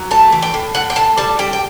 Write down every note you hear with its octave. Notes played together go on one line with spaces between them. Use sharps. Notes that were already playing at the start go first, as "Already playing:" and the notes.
Already playing: F#3
A3 A5
E3
G5
A2
A2 F#5
G5
A2 A5
G3 A5
G3 G5
G5